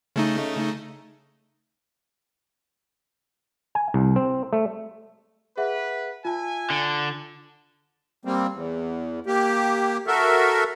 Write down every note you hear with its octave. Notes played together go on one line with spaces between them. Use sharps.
C#3 A3 D#4
G#5
C2
C4
A3
G#4 B4 E5 F#5
F4 E5 G#5 A5
D3
G3 A#3 C4
E2
A#3 G4
F#4 A4 A#4 E5